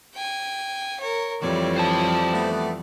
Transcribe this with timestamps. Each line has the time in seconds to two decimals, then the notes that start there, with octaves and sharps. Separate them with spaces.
0.14 G5 G#5
1.00 A#4 C#5
1.42 F2 A2 E3 G3 B4 C#5 D5
1.78 C5 A5
2.32 A3 B3